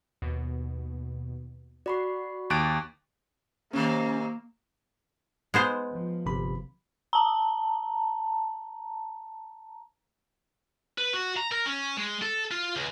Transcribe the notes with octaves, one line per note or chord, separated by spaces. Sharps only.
D#2 B2
F#4 D5 B5 C#6 C7
D#2 C#6 D6 F#6 A6 D7
C3 D#3 A#3 C#4
G#3 B3 C5
F3
G1 C3 B5
A5 A#5
B4
F#4
A#5
A#4
C#4
G#3
A4
F4
C#2